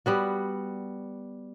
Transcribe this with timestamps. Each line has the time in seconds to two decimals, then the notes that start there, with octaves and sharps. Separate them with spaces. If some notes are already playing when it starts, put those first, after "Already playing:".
0.06 G3 B3 F#4